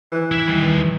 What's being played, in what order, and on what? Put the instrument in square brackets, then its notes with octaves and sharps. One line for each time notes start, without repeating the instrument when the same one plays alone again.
[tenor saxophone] E3
[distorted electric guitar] E4 E5
D#3 G3